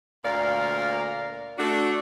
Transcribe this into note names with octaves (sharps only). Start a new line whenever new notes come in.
D2 A#2 A#3 A#4 D5 F5
A3 D4 F#4